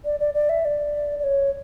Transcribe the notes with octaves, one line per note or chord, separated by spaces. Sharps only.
D5
D5
D5
E5
D5
D5
C#5